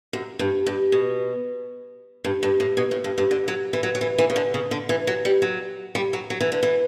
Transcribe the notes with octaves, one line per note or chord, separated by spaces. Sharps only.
F#2
G2
G2
B2
G2
G2
A2
B2
A2
G2
G2
D3
F#3
E3
F#3
F#3
E3
E3
C#3
D3
C#3
D3
E3
F#3
G3
F#3
G3
F#3
F#3
E3
D3
E3